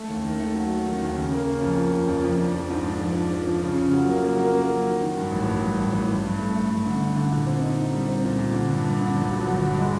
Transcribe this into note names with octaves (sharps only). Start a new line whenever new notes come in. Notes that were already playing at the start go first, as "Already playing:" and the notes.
Already playing: A3
D#2
D#3
A3
F#3
F#3
D#3
D#2
C#3
A#3
C#3
F2
F3
C#3
F2
F2
D4
F3
G#2
D4
F3
D4
F3
F3
C#3
C#3
F#3
A#3
F#3
A#3
A#3
F#3
D#3
D#3
G2
A1
G2
G2
A1
A1
G2
G2
A3
A3
G2
D3
D3
D3
A#2
C4
D#4
D#4
G3
C4
A#2
A#2
D3
G2
G2
D3
G1
F#3
G1
G2
G#3